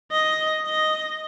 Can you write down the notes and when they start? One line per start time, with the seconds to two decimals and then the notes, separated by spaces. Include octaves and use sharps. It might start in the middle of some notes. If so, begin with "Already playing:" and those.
0.11 D#5
0.66 D#5